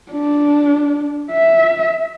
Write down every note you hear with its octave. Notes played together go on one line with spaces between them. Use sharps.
D4
E5